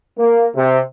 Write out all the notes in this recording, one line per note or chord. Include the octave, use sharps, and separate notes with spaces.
A#3
C3